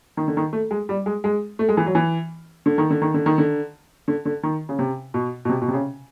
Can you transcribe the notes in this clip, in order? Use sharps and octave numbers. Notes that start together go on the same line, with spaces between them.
D#3
D3
D#3
A3
G#3
G3
G#3
G#3
A3
G#3
E3
F#3
E3
D3
D#3
D3
D#3
D3
D#3
D3
D3
D3
D#3
C#3
C3
B2
B2
C3
B2
C3
C#3